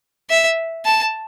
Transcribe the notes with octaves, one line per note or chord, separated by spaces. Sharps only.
E5
A5